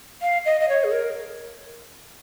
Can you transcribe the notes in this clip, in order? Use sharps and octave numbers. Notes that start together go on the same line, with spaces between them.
F5
D#5
D#5
C#5
G#4
A#4